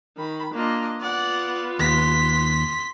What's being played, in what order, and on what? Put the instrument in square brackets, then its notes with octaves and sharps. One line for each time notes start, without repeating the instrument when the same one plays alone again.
[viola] D#3 B5
[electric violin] A#3 F4 [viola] D4 D#5
[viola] B3 F4 [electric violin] D5 F#5
[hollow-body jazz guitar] D#2 [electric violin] C6 B6